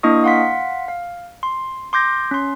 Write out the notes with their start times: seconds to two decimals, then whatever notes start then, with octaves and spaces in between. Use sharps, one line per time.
0.03 A#3 D4 E4 D#5 C#6 D#6
0.24 F5 F#5 C6 B6
0.88 F5
1.43 C6
1.93 C6 D6 G6 A#6
2.31 C#4 C6